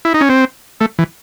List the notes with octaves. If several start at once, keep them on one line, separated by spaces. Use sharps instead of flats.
E4
D#4
C#4
C4
A3
E3